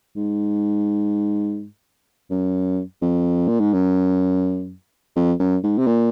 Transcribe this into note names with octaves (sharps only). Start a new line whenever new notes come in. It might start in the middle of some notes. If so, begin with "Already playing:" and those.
G#2
F#2
F2
A#2
G#2
F#2
F2
F#2
G#2
C3
A#2